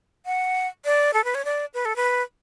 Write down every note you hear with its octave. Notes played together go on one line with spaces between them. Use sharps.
F#5
D5
A4
B4
C#5
D5
B4
A4
B4